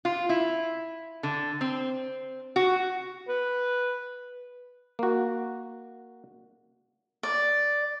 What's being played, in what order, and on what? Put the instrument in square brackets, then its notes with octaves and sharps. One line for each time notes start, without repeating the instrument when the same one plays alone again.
[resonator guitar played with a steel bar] F4
E4
D3
C4
F#4
[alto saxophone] B4
[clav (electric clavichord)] A#3 F#4
[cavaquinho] D5